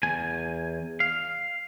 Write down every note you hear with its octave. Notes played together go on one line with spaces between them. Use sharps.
E2 G#5
F5